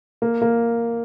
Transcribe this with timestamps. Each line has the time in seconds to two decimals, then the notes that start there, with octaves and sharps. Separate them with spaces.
0.22 A#3
0.42 A#3